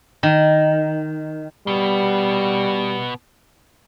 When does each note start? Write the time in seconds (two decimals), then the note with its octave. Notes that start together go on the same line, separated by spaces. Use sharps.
0.23 D#3
1.67 B2 G3 B3